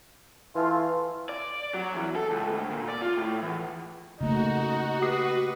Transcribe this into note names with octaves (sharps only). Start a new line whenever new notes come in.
E3 A3 F4
D5
F#3
E2
A4
C#2
D2
A#2
D5
F4
A2
E2
C#3 A3 A#3 D#4 F#4
G4 B4 D#6 C7